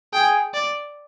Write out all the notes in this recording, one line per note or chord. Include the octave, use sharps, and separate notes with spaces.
G#4 G5
D5